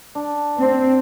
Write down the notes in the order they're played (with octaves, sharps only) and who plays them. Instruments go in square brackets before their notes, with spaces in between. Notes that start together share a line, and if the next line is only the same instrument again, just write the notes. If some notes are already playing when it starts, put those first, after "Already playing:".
[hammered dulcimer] D4
[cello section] C4